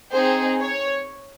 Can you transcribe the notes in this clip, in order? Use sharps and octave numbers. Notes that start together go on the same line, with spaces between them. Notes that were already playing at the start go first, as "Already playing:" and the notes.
C4 D#4 G#4 C5
C#5